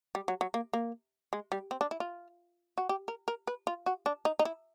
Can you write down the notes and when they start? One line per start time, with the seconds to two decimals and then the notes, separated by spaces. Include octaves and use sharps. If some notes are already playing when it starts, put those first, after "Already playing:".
0.15 G3
0.28 F#3
0.41 F#3
0.54 A#3
0.73 A#3
1.33 G#3
1.52 G3
1.71 C4
1.81 D4
1.91 E4
2.00 F4
2.78 F#4
2.89 G4
3.08 A#4
3.28 A#4
3.47 B4
3.67 F4
3.86 F#4
4.06 D4
4.25 D#4
4.39 D#4
4.45 E4